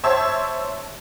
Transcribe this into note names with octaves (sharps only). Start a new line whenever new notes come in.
C5 C#5 E5 A5 E6 G#6